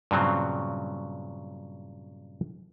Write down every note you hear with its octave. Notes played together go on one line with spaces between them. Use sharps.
G2 A#2 C#3 F#3 C4